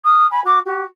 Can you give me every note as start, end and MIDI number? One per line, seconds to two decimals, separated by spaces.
0.05 0.25 87
0.05 0.25 89
0.30 0.40 80
0.30 0.40 83
0.43 0.59 66
0.43 0.59 86
0.65 0.83 66
0.65 0.83 67